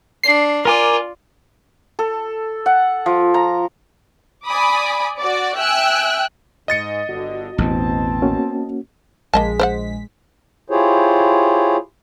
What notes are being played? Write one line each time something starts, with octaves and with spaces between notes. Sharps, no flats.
D4 C7
F4 A#4 D5 G#5 D6
A4
F#5
F3
A#5
D5 G#5 B5 D6 D#6
F#4 D5
E5 G5 G#5 E6 F#6
G#2 D#5 A6 C#7
G1 D3 F#4
A1 E2 B2 B3 C4 A5
A#3 C#4 F#4
A#1 G#3 A#3 D#5 A5 B6
C5 D5 F#5
E4 F4 G4 G#4 C5 C#5